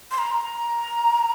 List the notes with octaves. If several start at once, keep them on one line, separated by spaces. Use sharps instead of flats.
C6
A#5